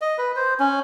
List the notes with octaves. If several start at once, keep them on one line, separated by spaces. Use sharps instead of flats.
D#5
B4
C5
C#4